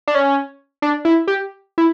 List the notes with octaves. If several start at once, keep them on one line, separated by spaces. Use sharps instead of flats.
D4
C#4
D4
E4
G4
E4